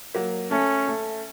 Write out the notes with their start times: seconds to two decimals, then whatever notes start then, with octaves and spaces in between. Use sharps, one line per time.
0.15 F#3 A#3
0.51 A3 C#4
0.88 A3